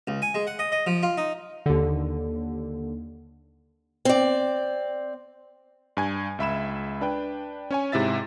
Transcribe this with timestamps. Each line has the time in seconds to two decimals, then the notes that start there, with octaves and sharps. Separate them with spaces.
0.07 C#2
0.22 G#5
0.35 G#3
0.47 F#5
0.59 D#5
0.72 D#5
0.86 F3
1.03 F4
1.17 D#4
1.66 D#2 D3
4.05 C4 D5
5.97 G2 G#5 G#6
6.39 C#2 E5 B5 E7
7.01 D4 B4 G5
7.71 C#4 C#5 G#5
7.92 G#2 C3 E4 E5 A6